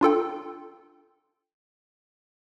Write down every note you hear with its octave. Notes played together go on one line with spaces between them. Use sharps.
D4 F4 A4 G5